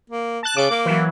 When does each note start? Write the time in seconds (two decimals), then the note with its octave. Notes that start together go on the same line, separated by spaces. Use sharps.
0.10 A#3
0.43 A5 F#6
0.57 C#3 D6
0.70 A#3
0.86 E3 F#3